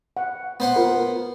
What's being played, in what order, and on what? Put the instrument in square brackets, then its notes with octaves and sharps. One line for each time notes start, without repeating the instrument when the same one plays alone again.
[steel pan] F#5
[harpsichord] B3 C5 F#5
[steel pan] F4 A#4